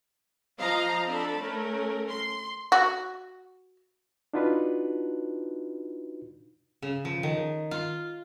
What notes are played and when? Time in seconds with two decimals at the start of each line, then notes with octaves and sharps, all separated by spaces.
0.60 F3 D#5 F5 A#5
1.08 C4 D4 A4 A5 B5
1.40 A3 C#4 A#4
2.10 C6
2.72 F#4
4.34 D4 D#4 F4 F#4 B4
6.82 C#3
7.05 F3
7.23 D#3
7.71 F4